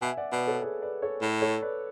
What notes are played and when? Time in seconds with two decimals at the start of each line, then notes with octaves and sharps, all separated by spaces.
0.02 B2 E5 G#5
0.17 D5 F#5
0.32 B2 B4 D5
0.47 A4 C#5
0.62 G#4 B4
0.82 B4 D5
1.02 A4 C#5
1.22 A2
1.42 A4 C#5
1.62 B4 D5